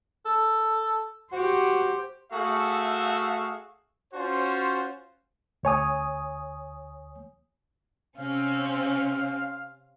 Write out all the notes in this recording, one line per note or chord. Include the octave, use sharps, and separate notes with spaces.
A4
F#4 G4 C5
A3 F#4 G#4 E5 F5
C#4 F4 F#4 C5
D2 C#5 G#5 D#6
C3 C4 C#4 F5